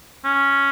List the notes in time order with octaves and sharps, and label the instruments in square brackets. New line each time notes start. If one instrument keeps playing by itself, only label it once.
[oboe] C#4